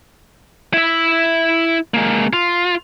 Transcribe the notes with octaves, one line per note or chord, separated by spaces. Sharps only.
E4 E5
G#3 A#3
F4